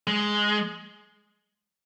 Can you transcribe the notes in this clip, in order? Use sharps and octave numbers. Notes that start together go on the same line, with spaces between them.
G#3